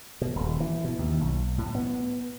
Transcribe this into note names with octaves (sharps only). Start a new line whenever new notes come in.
B2
D#1
E3
B2
D#2
B1
A2
B3